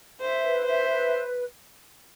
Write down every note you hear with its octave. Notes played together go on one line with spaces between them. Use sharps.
C5 E5
B4
C5 E5
B4